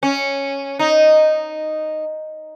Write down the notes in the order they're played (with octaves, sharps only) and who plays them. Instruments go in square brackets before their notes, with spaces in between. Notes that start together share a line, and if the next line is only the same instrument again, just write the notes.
[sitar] C#4
D#4